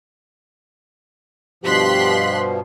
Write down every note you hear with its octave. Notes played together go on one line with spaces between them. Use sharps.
G2 B2 F3 G4 C6 F#6 B6